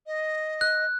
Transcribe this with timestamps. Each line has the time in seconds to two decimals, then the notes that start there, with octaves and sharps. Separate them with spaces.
0.07 D#5
0.61 F#6